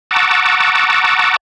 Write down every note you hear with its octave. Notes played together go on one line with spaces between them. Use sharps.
F#5 A5 A#5 C#6 D6 E6